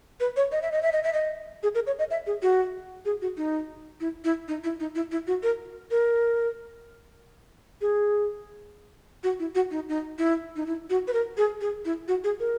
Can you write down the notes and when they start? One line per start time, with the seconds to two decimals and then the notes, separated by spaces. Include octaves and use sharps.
0.20 B4
0.36 C#5
0.52 D#5
0.62 E5
0.72 D#5
0.82 E5
0.92 D#5
1.03 E5
1.13 D#5
1.63 G#4
1.75 A#4
1.87 C#5
1.99 D#5
2.10 E5
2.26 G#4
2.42 F#4
3.05 G#4
3.22 F#4
3.37 D#4
4.00 E4
4.24 E4
4.48 D#4
4.64 E4
4.80 D#4
4.95 E4
5.11 E4
5.27 F#4
5.43 A#4
5.91 A#4
7.81 G#4
9.23 F#4
9.39 E4
9.55 F#4
9.71 D#4
9.89 D#4
10.18 E4
10.56 D#4
10.66 E4
10.90 F#4
11.07 B4
11.13 A#4
11.37 G#4
11.61 G#4
11.85 E4
12.08 F#4
12.24 G#4
12.40 A#4